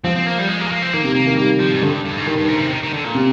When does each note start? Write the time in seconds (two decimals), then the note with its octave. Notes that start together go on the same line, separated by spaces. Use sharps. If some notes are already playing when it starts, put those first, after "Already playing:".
0.04 F3 C4
0.16 C4
0.26 A#3
0.38 G3
0.49 G#3
0.61 A#3
0.67 G#3
0.72 A#3
0.82 C4
0.93 D#3 A#3
1.04 C3
1.15 A#3
1.27 D#3
1.37 G3 A#3
1.60 F3
1.72 G#2
1.82 G2 D3
2.04 G2
2.17 G#2
2.27 G2 D#3
2.37 G2
2.48 G#2
2.59 C3
2.71 D#3
2.82 D#3
2.93 D3
3.04 A#2
3.15 C3